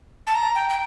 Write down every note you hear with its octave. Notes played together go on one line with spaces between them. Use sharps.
A5
A#5
G5
G5